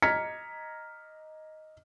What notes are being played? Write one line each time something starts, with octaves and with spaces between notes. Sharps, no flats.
D#5 A#5 F6 G#6 B6 C#7